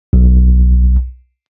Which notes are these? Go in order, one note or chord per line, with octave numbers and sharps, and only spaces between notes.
B1